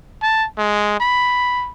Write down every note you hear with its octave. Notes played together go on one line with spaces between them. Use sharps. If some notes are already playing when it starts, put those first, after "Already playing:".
A5
G#3
B5